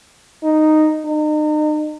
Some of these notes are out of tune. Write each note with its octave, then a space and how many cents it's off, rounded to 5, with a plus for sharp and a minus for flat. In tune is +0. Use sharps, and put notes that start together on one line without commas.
D#4 -5
D#4 -35